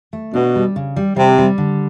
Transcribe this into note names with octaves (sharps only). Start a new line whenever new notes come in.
A3
B2 D4
G3
C#3
G3
C3 G3
G3
D3